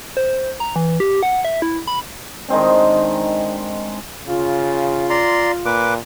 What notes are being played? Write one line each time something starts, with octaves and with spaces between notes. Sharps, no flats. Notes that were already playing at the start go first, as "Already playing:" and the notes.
C5
A#5
E3
G4
F#5
E5
E4
B5
D#3 G#3 C4 D4
C#3 F4
D5 A#5 C6
A#2 B4 D6